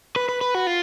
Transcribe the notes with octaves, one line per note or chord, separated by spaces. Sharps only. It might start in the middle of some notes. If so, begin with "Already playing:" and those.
B4
B4
B4
F#4
F4